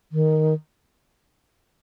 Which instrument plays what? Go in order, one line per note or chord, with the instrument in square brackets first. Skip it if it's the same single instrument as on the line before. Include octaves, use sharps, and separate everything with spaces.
[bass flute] D#3